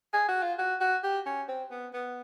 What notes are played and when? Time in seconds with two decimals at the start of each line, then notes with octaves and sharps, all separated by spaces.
0.13 G#4
0.29 F#4
0.42 F4
0.59 F#4
0.81 F#4
1.03 G4
1.26 C#4
1.48 C4
1.71 B3
1.93 B3